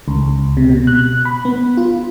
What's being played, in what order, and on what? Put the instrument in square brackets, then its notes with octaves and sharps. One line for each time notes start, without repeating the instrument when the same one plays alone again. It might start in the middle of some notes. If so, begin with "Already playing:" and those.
[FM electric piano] C#2
C3
B2
F#6
B5
B3
F4